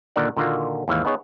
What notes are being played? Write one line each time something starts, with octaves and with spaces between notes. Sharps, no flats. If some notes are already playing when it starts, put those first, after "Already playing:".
A#2 D3 D#3 A#4 D5 F#5
A#2 D3 D#3 A#3 F4 F#4
D#2 G#2 E3 E5 F5
B3 D#4 G#4 C#5